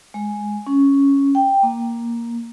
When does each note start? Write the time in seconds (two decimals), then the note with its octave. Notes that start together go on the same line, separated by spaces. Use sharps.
0.14 G#3
0.67 C#4
1.35 G5
1.63 A#3